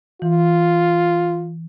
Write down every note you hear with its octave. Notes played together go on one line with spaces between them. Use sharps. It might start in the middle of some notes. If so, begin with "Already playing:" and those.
E3 F4